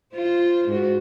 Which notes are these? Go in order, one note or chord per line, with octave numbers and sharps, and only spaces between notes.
F4 C5
G#2 F#4